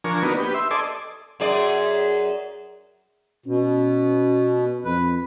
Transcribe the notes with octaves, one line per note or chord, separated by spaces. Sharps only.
F3 D4 A#4 G#5 C#6
A#3 B3 D4 D#4 F#4 B4
G4 B4
E5 C6
A4 D5 D#5 G#5 C6 D6
F#2 G#4 D5
B2 C#4
F2 B4